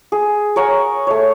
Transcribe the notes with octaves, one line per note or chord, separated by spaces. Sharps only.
G#4
A#4 C#5 F#5 G#5
A3 C#5